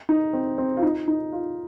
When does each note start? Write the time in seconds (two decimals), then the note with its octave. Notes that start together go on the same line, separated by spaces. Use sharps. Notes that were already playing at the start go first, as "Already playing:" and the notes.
0.09 D#4
0.33 C4
0.58 C4
0.77 F4
0.83 D#4
1.08 D#4
1.32 F4